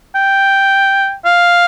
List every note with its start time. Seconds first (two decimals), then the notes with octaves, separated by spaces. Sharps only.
0.15 G5
1.25 F5